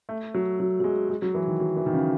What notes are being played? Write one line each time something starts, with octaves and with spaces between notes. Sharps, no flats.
A3
F#3
F#3
F#3
G#3
G#3
F#3
E3
D#3
F#3
E3
D#3
C#3